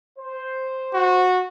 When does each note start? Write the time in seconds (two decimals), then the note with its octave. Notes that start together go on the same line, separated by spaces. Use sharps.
0.19 C5
0.94 F#4